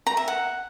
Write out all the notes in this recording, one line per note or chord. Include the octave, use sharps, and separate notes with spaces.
A#5
E5
F#5